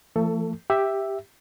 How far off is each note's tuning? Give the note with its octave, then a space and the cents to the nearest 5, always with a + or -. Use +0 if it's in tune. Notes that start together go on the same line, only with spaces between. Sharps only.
F3 -40 A3 +40 A4 +10
G4 +5 E5 +0